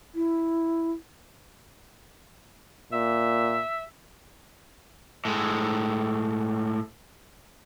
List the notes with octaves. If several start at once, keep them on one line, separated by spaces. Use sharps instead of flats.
E4
A#2 E5
A2 G#3